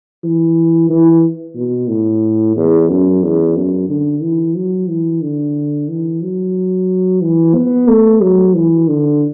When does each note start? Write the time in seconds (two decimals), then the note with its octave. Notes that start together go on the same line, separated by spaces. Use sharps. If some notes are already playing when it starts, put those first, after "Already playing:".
0.24 E3
0.89 E3
1.55 B2
1.89 A2
2.56 E2
2.89 F#2
3.23 E2
3.56 F#2
3.89 D3
4.22 E3
4.56 F#3
4.88 E3
5.22 D3
5.89 E3
6.22 F#3
7.21 E3
7.55 B3
7.88 A3
8.21 F#3
8.55 E3
8.88 D3